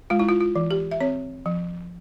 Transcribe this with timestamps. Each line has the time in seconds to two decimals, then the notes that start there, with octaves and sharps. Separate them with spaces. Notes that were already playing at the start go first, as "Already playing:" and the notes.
0.10 G#3 F4
0.19 E4
0.29 F4
0.40 F4
0.56 E3
0.71 G4
0.91 E5
1.00 C4 C#5
1.46 F3